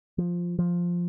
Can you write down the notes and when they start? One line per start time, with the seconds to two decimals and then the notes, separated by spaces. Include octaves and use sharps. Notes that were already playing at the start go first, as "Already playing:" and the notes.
0.18 F3
0.59 F3